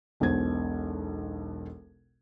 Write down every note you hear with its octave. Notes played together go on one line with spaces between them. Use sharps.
E1 B1 B2 C5 G#6